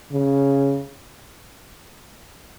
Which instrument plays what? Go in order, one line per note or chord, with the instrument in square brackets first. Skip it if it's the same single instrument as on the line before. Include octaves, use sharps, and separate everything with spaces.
[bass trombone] C#3